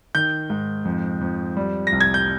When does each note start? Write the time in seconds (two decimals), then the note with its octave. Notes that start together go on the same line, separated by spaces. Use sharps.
0.15 D#3 G6
0.50 G#2
0.85 F2
1.21 F2
1.57 G3
1.87 A#6
1.92 C2
2.01 G#6
2.14 G6